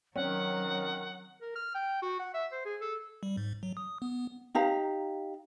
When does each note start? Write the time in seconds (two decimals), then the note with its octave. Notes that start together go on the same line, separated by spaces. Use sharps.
0.16 D#3 F#3 C4 C#4 F#5
1.41 A#4
1.56 F6
1.75 G5
2.02 F#4
2.19 F#5
2.34 E5
2.52 C5
2.65 G#4
2.81 A4
3.23 G3
3.37 G#2
3.63 F#3
3.77 D#6
4.02 B3
4.55 D#4 G4 F5 A#5